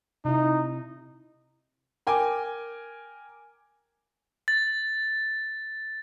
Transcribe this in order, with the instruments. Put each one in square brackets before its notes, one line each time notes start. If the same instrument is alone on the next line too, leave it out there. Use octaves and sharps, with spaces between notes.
[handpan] C3 E4 [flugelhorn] D#4
[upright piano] A#4 G5 G#5 D6
[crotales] A6